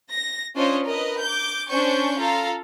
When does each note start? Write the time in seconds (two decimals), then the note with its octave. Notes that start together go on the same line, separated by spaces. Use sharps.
0.11 A#6
0.56 C#4 D4 F4 C5 C#5 D#5
0.86 A#4 B4 D#5
1.20 D6 G6
1.69 C#4 D4 C5 G#5 C#6 G6
2.18 F4 A4 F5 A#5